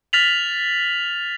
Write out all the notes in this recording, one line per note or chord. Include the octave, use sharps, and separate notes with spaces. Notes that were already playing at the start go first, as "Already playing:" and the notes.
F6 A6 B6 F7 F#7